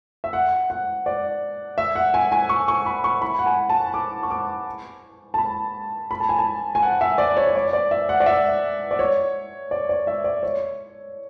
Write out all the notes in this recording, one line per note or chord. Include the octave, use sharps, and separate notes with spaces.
E5
F#5
F#5
D5
E5
F#5
G#5
G#5
C#6
C#6
B5
C#6
B5
F#5
G#5
A5
D6
C#6
D6
A5
B5
B5
A5
G#5
A5
G#5
F#5
E5
D5
C#5
C#5
D5
D5
E5
F#5
D5
E5
D5
C#5
D5
D5
E5
D5
C#5